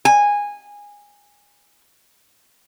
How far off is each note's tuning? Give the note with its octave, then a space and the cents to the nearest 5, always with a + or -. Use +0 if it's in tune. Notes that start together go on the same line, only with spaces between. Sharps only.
G#5 -15